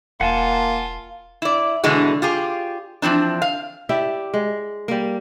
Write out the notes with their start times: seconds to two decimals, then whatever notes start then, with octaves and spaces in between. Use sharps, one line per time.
0.21 E1 A#3 F4 F#5 G#5 A5
1.42 E4 D5
1.84 B2 D3 E3 G#3 B3
2.22 F4 G4 G#4
3.02 E3 F3 C4 D4
3.42 F5
3.89 E4 G4 D5 E5
4.34 G#3
4.88 G3 A#3